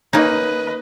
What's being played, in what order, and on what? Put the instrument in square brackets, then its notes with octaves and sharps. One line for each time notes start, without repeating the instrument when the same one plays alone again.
[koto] A#3 C#4 D#4 [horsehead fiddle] B4 D#5